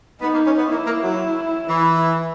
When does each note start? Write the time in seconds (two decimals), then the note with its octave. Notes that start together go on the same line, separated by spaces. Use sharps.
0.21 B3 D#4
0.34 A#3
0.46 C#4
0.57 B3
0.70 A#3 E4
0.86 A#3
1.02 F#3
1.68 E3